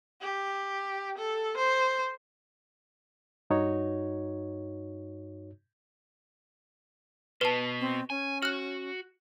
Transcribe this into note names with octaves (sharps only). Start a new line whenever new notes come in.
G4
A4
C5
G2 D#4 F#4 C#5
B2 B4 A5
C4
C#4 G#5
F#4 F6 F#6